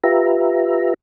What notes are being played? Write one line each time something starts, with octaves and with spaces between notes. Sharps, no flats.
F4 G4 B4 E5 A#5